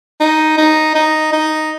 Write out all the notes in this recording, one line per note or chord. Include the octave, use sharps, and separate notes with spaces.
D#4
D#4
D#4
D#4